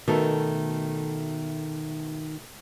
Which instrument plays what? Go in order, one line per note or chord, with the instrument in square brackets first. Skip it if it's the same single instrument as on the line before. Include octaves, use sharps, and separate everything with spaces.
[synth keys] B2 A3 [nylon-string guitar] D#3